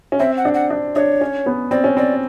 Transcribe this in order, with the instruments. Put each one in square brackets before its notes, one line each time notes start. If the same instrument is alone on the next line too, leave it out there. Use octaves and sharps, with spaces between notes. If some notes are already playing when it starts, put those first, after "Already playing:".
[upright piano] C#4
[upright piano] C4 [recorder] E5
[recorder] F#5
[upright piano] D4
[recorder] F#5
[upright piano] D4
[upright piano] D4 [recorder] C#5
[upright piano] C#4
B3
[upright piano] C4 [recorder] D5
[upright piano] C#4
[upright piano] C4 [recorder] D5